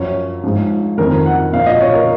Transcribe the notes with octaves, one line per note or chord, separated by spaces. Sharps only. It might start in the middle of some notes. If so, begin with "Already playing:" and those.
Already playing: F#2 F3 C#5
G#2 F3
F2 D#3 A#4
F#5
A#2 F3 F5
D#5
C#5
A#4